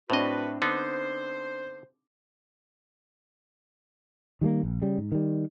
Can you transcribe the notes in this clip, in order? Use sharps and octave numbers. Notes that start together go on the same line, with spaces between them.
A2 C4 D4 F#4 B4 D#5
D3 B3 D#4 C5
D#3 G3 G#3 A#3
A#1
C#3 G3
G#2
D#3 G3